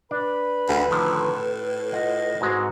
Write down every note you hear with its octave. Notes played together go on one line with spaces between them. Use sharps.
D4 B4 D5 B5
D2
A2 D3 D#3 F3
A4
F4 D#5 F#5
G#2 G#3 C4 F#4